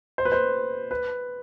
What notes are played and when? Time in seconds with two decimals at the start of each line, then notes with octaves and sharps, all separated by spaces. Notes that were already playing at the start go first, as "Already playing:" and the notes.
0.18 C5
0.25 B4
0.32 C5
0.91 B4